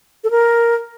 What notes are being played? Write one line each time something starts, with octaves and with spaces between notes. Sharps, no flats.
A4
A#4